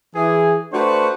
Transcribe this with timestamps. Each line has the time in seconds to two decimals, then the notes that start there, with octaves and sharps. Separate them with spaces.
0.15 E3 G#4
0.73 A3 D4 F#4 B4 C5 F#5